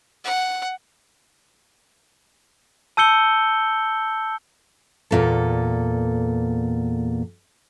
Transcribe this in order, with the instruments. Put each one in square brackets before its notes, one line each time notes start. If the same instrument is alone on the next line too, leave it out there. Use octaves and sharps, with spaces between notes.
[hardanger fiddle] F#5
[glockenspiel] A5 E6 G6 C#7 G7
[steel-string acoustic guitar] E2 A#2 A4